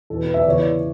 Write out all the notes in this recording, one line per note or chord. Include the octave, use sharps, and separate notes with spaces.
E2 B2 A4
B4
E5
D5
E2 C#3 E3 C#5
D5